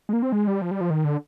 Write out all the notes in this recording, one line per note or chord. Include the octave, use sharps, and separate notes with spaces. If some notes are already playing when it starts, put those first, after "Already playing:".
G#3
A#3
C4
G#3
G3
F3
G3
F3
D#3
D3